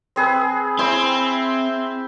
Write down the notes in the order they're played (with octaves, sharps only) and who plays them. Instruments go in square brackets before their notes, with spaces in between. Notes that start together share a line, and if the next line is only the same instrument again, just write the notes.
[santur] C4 G#4 B4
[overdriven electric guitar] C4 [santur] E4 C5